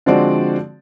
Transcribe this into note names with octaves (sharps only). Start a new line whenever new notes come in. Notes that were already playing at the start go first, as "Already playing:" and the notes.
D3 F3 G#3 C4 F#4 D5